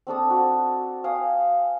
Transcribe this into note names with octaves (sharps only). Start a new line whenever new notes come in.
C4 D4 A4 D#6
F#4
F5 G5 G#5 D#6